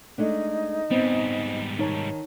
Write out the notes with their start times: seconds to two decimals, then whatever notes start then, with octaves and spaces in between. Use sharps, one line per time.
0.18 G#3 A3 D4 D#4
0.91 G#2 G3 B3 C4
1.79 D#3 D#4 C#5 A5